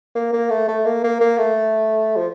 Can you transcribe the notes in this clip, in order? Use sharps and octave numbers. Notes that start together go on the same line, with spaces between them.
A#3
A#3
A3
A3
A#3
A#3
A#3
A3
F3